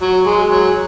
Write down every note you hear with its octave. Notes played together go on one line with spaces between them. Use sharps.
F#3
G#3
F#3